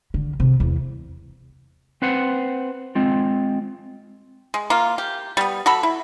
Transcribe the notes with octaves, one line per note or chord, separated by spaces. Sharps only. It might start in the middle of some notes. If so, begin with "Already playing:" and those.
D3
C3
E2
C4 B4 C5 F#5
G#3 C4 F4
G#3
A#3 F4
G4
G3 B3
F#4 A4 B5
E4